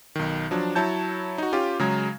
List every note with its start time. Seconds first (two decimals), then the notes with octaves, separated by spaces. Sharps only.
0.15 B1 D#3
0.51 F3 F#3 D4
0.75 F#3 E4 C#5 A5 G6
1.38 D#4 F#4
1.53 C#4 F4 G4
1.79 C#3 F#3 G#3 A#5 G#6